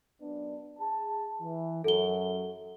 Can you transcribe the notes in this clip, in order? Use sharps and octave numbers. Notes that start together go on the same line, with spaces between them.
F#2 B3 D4
G#4 A5
E3
F#2 A4 G7